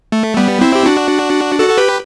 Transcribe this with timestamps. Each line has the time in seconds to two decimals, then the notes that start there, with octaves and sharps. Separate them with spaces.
0.12 A3
0.37 G3 B3
0.61 C4 E4
0.75 G4
0.86 D4 F#4
1.59 F#4 A4
1.70 A4
1.78 G4 B4